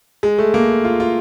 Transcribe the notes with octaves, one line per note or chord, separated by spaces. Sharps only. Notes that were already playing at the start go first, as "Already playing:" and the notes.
G#3
A3
A#3
F4
F4